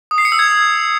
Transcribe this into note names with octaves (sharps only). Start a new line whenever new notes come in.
D#6
C7
C#7
E6
G#6